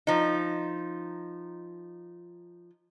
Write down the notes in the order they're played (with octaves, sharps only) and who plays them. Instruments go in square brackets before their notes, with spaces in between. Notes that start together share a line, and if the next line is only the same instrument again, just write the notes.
[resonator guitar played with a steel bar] F3 D#4